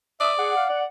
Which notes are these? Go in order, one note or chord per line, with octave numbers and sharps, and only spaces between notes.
D5 E5 D#6
G#4 F#5
F5
D5